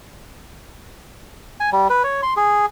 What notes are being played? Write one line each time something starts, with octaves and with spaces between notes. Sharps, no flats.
G#5
G3
B4
C#5
C6
G#4